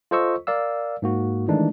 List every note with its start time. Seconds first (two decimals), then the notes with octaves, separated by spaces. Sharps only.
0.11 F4 A4 C5 D#5 C#6 E6
0.47 A#4 D5 F5 E6
1.02 G#2 A#3 F#4
1.48 D#3 E3 G#3 A3 D4 D#4